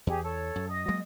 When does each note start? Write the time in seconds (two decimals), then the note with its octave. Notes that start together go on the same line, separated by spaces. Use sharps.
0.07 E2 G4 G#4
0.23 A4 C#5
0.56 F#2
0.69 D#5 D#6
0.88 F#3 G#3 A#3